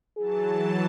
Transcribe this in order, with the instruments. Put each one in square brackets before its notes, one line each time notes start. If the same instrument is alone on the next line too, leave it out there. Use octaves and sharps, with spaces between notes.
[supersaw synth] E3 F#3 A5 [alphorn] G#4